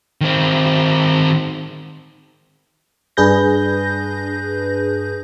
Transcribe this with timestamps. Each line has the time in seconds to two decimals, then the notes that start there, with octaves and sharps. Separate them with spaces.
0.21 D#3 C4
3.17 G2 D4 G#4 B4 G6 A#6